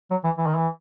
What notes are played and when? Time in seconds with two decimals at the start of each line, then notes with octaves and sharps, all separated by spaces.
0.11 F#3
0.24 E3
0.38 E3
0.47 D#3
0.56 E3